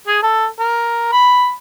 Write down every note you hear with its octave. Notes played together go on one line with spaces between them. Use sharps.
G#4
A4
A#4
B5